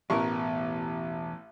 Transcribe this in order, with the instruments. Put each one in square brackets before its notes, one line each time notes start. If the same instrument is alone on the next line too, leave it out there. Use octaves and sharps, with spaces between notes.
[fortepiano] A1 C#6 [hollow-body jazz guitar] E2 B2 A#4